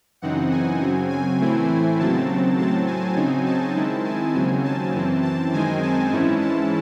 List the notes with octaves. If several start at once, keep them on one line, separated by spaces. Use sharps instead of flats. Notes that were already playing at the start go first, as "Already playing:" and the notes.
F#2 C#3 E3 C4 D#4 F#5
G#5
F#2 C#3 F#3 C4
G#5
A2 E3 A3 C4 E4
D#2 C#3 F#3 C4 A5
A2 F#3 C4 A5
G#5
C#3 F#3 C4 D#4
A5
D#3 G#3 C4 E4
G#5
D#2 C#3 F#3 C4
A5
F#2 E3 C4
A5
F#2 D#3 G#3 C4 D#4 G#5
A5
G#2 E3 G#3 C#4 E4
A5